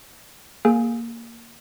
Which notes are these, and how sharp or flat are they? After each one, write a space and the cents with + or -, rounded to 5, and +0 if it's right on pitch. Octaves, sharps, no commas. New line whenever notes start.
A#3 -5 G#4 +0 G#5 +0